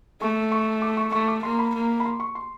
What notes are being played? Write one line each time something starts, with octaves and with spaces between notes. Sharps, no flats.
A3 C#6
C#6
D6
C#6
A3 C#6
D6
A#3 C6
B5
A#3
B5
C6
C#6
C6